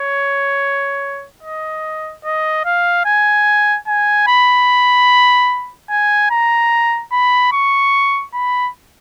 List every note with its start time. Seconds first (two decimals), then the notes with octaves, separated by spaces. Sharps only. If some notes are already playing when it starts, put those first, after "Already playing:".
Already playing: C#5
1.43 D#5
2.25 D#5
2.65 F5
3.06 G#5
3.87 G#5
4.27 B5
5.90 G#5
6.31 A#5
7.12 B5
7.52 C#6
8.34 B5